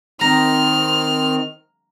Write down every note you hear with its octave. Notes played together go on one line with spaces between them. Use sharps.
D#3 C4 D#4 A#5 F6